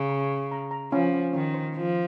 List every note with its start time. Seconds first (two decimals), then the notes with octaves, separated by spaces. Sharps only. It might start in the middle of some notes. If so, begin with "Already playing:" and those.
Already playing: C#3
0.09 A#5
0.30 C#6
0.51 A#5
0.71 A#5
0.92 F3 C#4
1.14 C#4
1.33 D#3 C#4
1.54 C5
1.75 F3 C#4